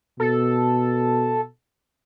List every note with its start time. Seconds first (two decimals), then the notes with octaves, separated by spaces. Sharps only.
0.20 B2 A4